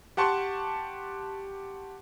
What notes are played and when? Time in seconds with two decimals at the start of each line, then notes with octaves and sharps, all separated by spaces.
0.17 G4 F#5 A5 C6 C#6